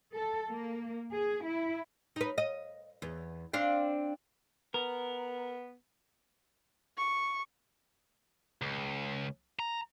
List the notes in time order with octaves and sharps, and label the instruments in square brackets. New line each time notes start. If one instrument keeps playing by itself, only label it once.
[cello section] A4
A#3
G#4
E4
[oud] D#4 B4
D#5
E2
C4 D4 F5
[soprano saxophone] B3 [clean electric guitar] A#4
[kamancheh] C#6
[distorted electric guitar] C#2
A#5